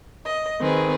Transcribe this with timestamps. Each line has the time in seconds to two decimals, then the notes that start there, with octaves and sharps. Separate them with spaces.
0.25 D#5
0.60 D#3 C4 G#4 B4